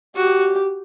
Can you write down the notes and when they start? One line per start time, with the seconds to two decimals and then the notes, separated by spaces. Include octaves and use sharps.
0.16 F#4 G4